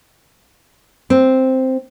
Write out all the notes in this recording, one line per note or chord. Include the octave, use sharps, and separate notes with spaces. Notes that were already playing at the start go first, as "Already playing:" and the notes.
C4